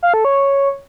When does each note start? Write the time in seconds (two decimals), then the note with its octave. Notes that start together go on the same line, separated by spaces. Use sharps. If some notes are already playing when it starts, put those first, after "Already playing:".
0.03 F5
0.14 A4
0.25 C#5